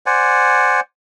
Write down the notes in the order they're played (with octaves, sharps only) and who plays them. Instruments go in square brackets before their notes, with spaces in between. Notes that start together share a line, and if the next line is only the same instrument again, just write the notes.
[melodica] C5 D5 F#5 G#5